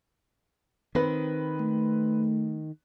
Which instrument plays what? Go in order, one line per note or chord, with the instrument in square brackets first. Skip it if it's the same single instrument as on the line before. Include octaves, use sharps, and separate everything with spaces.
[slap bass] D#3 [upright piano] C4 B4
[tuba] A3